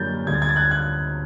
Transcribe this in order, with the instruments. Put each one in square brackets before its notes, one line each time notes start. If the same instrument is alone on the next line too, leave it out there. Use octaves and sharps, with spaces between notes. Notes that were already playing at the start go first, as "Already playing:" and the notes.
Already playing: [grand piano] F#2 D3 G3 A#3 G6 A6
D2 D3 G3 G#6
A6
G#6
A6
F#6 G#6
F#6 G#6